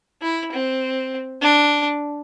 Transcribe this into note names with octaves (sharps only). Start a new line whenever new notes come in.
E4
C4
D4